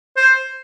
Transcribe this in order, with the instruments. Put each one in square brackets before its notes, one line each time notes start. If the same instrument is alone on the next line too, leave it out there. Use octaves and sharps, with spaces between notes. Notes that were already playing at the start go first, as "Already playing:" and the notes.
[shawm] C5